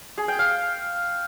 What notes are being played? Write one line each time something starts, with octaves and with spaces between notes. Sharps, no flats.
G#4
G5
F5